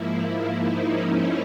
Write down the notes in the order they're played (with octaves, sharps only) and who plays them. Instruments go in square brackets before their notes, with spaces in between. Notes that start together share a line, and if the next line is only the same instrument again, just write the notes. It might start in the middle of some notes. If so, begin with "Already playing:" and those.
Already playing: [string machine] G#2 F3 A#3 E4
E4
D#4
C#4